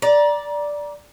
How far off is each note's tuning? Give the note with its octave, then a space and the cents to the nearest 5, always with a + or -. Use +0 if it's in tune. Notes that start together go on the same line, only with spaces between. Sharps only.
D5 +0 A#5 +30